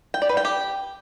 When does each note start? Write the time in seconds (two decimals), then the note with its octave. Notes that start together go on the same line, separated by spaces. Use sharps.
0.14 G5
0.22 D5
0.29 B4
0.37 G5
0.45 G4